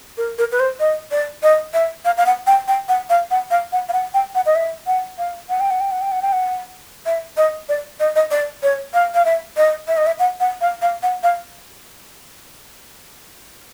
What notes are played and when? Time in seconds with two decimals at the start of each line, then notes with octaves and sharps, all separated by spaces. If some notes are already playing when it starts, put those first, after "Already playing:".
0.17 A#4
0.38 A#4
0.52 B4
0.60 C5
0.80 D#5
1.11 D5
1.43 D#5
1.74 E5
2.05 F5
2.17 F5
2.26 F#5
2.47 G5
2.68 G5
2.89 F#5
3.10 F5
3.31 F#5
3.51 F5
3.72 F#5
3.89 F5
3.93 F#5
4.14 G5
4.35 F#5
4.46 D#5
4.55 E5
4.87 F#5
5.18 F5
5.49 F#5
5.60 G5
5.70 F#5
5.80 G5
5.91 F#5
6.01 G5
6.12 F#5
6.22 G5
6.32 F#5
7.06 E5
7.37 D#5
7.69 D5
8.00 D#5
8.16 D#5
8.31 D5
8.63 C#5
8.94 F5
9.14 F5
9.25 E5
9.57 D#5
9.88 E5
9.97 D#5
10.06 E5
10.19 F#5
10.40 F#5
10.61 F5
10.82 F5
11.03 F#5
11.23 F5